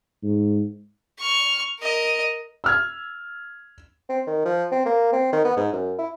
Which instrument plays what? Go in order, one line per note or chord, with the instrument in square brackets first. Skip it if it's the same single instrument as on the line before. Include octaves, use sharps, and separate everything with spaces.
[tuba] G#2
[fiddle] C#6 F6
A#4 D#5
[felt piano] E6 F6 G#6
[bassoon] C4
D#3
F3
C4
A#3
C4
D#3
B3
G#2
F#2
E4